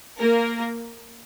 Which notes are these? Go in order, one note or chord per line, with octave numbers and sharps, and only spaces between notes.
A#3 A#4